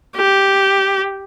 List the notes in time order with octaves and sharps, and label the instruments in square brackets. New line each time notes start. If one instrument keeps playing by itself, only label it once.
[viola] G4